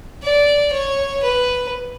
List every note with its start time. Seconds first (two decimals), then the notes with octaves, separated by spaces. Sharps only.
0.23 D5
0.73 C#5
1.23 B4